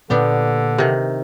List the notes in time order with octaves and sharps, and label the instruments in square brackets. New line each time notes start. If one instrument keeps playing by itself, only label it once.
[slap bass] A#2 A#3 [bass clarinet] D3 [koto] B3 D4 G4
[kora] C3 D#3